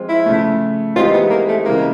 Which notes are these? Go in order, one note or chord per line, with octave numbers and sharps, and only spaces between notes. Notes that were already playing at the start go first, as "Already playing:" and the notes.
Already playing: F3 G#3 C4 F4
E4
C#3 F3 A3
E3 G#3 C4 D#4 F4 G4
B3
A#3
A3
C#3 E3 G#3 A#3